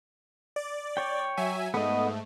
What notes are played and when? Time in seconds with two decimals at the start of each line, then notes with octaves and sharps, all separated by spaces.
0.56 D5
0.97 C#5 G5
1.37 F#3 E5 G#5
1.74 G#2 A3 B3 D#5